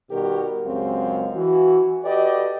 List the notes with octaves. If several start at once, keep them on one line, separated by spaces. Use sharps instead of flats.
B2 D#3 G3 F#4 G4 A#4
C#2 F#2 F#3 G#3 C4 F5
E3 F#4
F#4 G4 A4 B4 D5 D#5